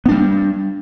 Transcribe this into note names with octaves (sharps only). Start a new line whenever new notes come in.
G3 B3 D4